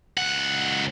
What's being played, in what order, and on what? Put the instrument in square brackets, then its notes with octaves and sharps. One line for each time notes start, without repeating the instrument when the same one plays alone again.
[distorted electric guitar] C#2 F#5